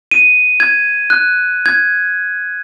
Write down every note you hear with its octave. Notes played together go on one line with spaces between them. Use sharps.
D#7
G#6
F#6
G#6